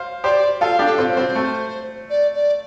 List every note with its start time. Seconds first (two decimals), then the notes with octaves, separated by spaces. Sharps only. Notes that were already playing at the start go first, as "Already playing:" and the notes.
Already playing: C5 F5
0.24 G4 C5 D5
0.61 F4 A4 F5
0.79 D4 G4
0.86 A4
0.98 C4 F4
1.11 C5
1.17 C4
1.35 A3
2.10 D5
2.35 D5